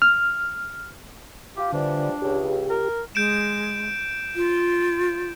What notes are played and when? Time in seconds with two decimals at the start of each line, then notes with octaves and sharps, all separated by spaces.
0.02 F6
1.57 F4 G4
1.72 D3 E3 F3 G3 D4
2.22 C#2 G4
2.70 A#4
3.15 G#3 G6 D7 E7
4.36 F4